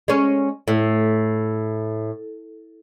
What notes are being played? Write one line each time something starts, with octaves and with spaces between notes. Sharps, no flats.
G#3 C#4
A2